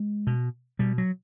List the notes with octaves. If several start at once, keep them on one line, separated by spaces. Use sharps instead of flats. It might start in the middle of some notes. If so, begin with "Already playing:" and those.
Already playing: G#3
B2
B2 G3
F#3